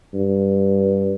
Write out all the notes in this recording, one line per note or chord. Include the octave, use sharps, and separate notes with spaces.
G2